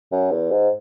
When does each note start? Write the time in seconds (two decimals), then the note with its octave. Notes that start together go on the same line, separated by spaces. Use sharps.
0.12 F#2
0.31 E2
0.51 G#2